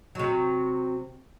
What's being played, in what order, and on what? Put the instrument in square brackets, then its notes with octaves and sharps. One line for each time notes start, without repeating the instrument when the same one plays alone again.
[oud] C3 F#3